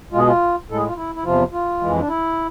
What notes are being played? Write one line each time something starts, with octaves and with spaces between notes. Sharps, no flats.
B2 G#3 F4
G#4
F4
A2 G#3 A4
G#4
F4
E4
E4
E2 C3 F3 F4
F4
F2 E3 G#3
D4
E4